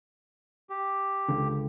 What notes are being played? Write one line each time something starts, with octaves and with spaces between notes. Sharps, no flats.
G4
C#2 D3